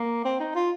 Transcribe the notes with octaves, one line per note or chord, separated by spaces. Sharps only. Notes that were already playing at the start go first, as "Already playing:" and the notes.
Already playing: A#3
C4
D#4
F4